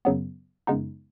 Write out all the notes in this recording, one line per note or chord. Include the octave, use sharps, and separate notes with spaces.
F#2 C#3 F#3 B3
F#2 C#3 G#3 B3 D#4